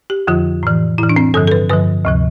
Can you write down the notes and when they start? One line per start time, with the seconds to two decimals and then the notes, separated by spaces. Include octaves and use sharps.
0.10 G4
0.27 F2 D3 F3 F4
0.63 A2 E3
0.98 A2 E3 E4
1.09 D4
1.16 C4
1.34 G2 D3 F3 A4
1.47 A4
1.51 B4
1.70 G2 D3 F3 B4
2.05 D2 C3 F3